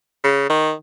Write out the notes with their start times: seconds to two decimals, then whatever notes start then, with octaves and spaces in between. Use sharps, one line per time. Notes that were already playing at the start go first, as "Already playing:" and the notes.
0.24 C#3
0.50 D#3